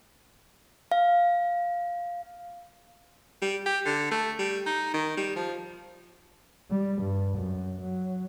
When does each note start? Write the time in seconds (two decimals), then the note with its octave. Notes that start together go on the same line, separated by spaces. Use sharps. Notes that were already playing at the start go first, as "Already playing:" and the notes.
0.92 F5
3.42 G3
3.66 G4
3.86 D3
4.11 A3
4.39 G3
4.66 D#4
4.94 D#3
5.17 G3
5.36 F3
6.71 G3
7.02 G2
7.37 F#2
7.82 F#3